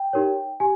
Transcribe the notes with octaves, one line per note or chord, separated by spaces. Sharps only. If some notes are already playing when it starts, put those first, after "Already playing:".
Already playing: G5
D#4 G4 A#4 C#5
G4 G#5